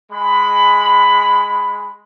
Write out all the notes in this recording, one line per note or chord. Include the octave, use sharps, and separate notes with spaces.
G#3 B5